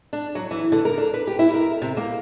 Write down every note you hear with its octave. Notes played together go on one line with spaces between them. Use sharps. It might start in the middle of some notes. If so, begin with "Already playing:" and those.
D4
F#3
E3
D3
A#4
D4
B4
G4
E4
A#4
C3
A#3